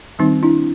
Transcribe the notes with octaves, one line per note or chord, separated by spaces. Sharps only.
D#3 G3 C4 D#4
D4 E4